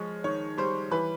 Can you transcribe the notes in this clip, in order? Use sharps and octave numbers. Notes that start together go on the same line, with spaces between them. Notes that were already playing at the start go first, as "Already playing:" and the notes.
Already playing: F3 G#3 C#5
D#3 C#5
G3 C5
E3 B4